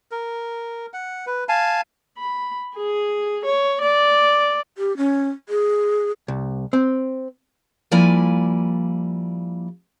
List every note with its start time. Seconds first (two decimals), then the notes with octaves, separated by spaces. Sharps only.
0.11 A#4
0.93 F#5
1.26 B4
1.49 F5 G#5 A5
2.18 B5
2.75 G#4
3.45 C#5
3.81 D5
4.78 G4
4.97 C#4
5.49 G#4
6.28 C2
6.73 C4
7.91 F3 G3 A#3 E4 D5 G#5